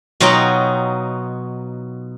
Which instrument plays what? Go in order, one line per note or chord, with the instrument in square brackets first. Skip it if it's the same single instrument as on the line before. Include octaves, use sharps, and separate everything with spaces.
[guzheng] B2 F#3 D#4 F4 F#4 G5